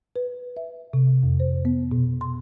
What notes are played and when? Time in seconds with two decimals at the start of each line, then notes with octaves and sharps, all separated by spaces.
0.16 B4
0.57 E5
0.93 C3
1.23 F2
1.40 C5
1.65 B3
1.92 B2
2.21 C6